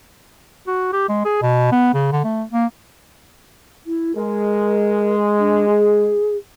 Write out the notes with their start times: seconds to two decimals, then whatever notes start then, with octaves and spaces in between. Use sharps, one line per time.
0.67 F#4
0.93 G4
1.09 G#3
1.25 G#4
1.42 B2
1.72 B3
1.94 C#3
2.12 D3
2.25 A3
2.52 A#3
3.86 E4
4.16 G#3 A#4
5.39 D4
5.68 G#4